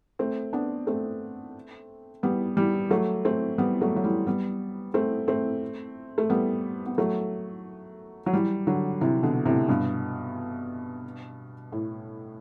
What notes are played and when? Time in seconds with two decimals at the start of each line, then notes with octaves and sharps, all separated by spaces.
0.19 A3 C4
0.53 B3 D4
0.87 A3 C4
2.23 G3 B3
2.57 E3 G3
2.90 F#3 A3
3.25 A3 C4
3.58 G3 B3
3.81 F#3 A3
3.96 F#3
4.04 E3 G3
4.27 G3 B3
4.94 A3 C4
5.28 A3 C4
6.18 A3
6.30 G3 B3
6.86 B3
6.98 F#3 A3
8.26 F#3
8.33 E3 G3
8.67 D3 F#3
9.01 C3 E3
9.23 B2 D3
9.45 A2 C3
9.68 G2 B2
11.72 A2